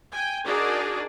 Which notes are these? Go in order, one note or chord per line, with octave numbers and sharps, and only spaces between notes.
G5 G#5
D4 D#4 F#4 G#4 A#4 D5